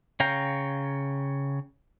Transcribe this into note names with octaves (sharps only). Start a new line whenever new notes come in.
C#3 C#5 F5 G5 A#5